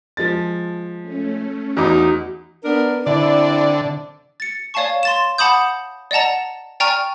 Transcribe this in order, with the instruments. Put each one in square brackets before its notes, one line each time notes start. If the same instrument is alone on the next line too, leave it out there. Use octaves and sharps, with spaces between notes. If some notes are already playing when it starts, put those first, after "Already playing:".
[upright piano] F3 G#3 A6
[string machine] A3 C#4
[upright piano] E2 D6 [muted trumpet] D#4 [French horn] F#4
[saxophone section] B3 D4 A#4
[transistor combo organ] D3 [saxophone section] C4 E4 D5
[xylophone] A6 C#7
C#5 D5 F5 G#5 A5 C#6
C6 A6 E7
F#5 A5 B5 D6 D#6 G6
D5 D#5 F#5 A5 A#5
D5 G5 G#5 A#5 C#6 F6